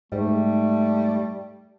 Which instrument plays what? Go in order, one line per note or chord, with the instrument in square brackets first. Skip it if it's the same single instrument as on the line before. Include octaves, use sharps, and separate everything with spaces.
[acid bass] G#2 [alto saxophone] G3 [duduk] A3